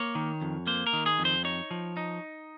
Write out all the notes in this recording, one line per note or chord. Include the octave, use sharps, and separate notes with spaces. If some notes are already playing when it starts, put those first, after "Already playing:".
Already playing: A#3 C#5
D#3
F2
A#3 C5
A#4
D#3
G#4
F2
C5
D#4 C#5
F3
D#4